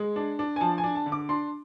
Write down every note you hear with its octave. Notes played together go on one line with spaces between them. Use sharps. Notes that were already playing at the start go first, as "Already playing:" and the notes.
Already playing: G#3
D4
D4
G#5
F3 A5
G#5
D4
A5
D3
D6
D4 C6